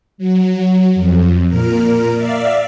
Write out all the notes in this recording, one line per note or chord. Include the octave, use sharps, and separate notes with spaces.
F#3
F2
A#2 A#4
D5 E5 F5